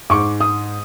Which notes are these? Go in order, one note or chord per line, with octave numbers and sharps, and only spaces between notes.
G#2 C#6 D6
D#6